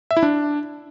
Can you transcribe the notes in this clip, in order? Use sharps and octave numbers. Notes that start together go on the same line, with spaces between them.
E5
E4
D4